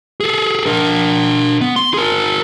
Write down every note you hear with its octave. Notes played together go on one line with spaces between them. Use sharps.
G#4 A4
D4 A#4
B3
C6
G#4 A#4